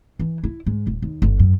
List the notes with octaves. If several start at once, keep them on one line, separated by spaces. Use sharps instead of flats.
E3
E4
G#2
D#1
D#2
G1
F#2